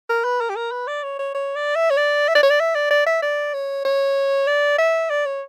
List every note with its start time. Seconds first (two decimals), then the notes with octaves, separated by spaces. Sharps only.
0.09 A#4
0.24 B4
0.41 A#4
0.49 G4
0.56 A#4
0.72 B4
0.87 D5
1.03 C#5
1.19 C#5
1.34 C#5
1.56 D5
1.76 E5
1.90 C#5
1.97 D5
2.28 E5
2.35 D5
2.43 C#5
2.50 D5
2.60 E5
2.75 D5
2.90 D5
3.06 E5
3.22 D5
3.54 C#5
3.85 C#5
4.47 D5
4.78 E5
5.10 D5
5.25 C#5